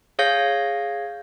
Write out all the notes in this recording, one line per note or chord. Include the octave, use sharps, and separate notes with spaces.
G#4 C#5 F5 G6 A#6